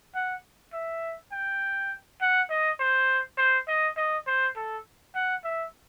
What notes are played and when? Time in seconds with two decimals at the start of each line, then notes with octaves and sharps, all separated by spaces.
0.15 F#5
0.73 E5
1.32 G5
2.21 F#5
2.50 D#5
2.79 C5
3.38 C5
3.68 D#5
3.97 D#5
4.27 C5
4.56 A4
5.15 F#5
5.44 E5